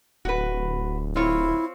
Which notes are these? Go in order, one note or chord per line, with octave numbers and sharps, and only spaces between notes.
D1 F#4 B4
C4 E4 F4 C#5